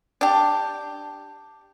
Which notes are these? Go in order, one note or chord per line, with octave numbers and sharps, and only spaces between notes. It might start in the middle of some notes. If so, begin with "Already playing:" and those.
D4 G4